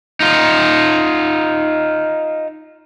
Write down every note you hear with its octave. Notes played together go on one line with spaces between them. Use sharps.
D#4 F4